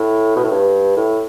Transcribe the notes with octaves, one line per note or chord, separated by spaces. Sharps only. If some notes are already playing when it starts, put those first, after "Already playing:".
Already playing: A2
B2
A2
G2
A2